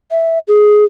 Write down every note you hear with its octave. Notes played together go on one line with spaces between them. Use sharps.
E5
G#4